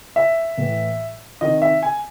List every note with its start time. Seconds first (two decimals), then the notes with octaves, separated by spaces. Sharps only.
0.16 E5
0.58 A2 E3
1.41 C3 D#3 D#5
1.62 E5
1.83 G#5